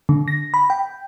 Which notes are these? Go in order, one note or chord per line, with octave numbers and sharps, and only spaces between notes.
D3
A#6
B5
G5